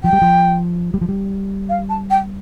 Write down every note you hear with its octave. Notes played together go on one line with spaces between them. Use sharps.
F3 G5
G3
F3
G3
F3
G3
F5
A5
G5